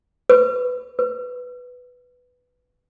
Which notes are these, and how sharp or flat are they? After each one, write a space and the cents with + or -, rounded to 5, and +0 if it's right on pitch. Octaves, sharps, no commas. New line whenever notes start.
B4 +10
B4 +5